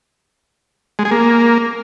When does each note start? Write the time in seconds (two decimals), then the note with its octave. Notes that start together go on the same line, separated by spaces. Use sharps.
0.99 G#3
1.05 G#4
1.11 A#3